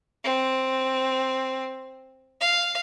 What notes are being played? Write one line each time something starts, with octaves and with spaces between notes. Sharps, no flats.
C4
F5